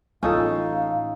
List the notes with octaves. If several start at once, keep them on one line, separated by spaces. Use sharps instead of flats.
A1 C#4 D#4 F4 A4 F5